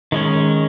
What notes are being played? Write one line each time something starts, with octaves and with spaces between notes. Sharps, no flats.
D#3 G#3 C#4